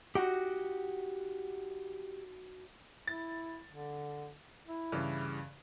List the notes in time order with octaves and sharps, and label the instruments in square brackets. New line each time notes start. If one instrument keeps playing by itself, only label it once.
[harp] D#4 F#4 [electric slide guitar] G4 F#5
[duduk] E4 [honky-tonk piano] A6
[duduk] D3
E4
[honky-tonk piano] G2 C#3 E3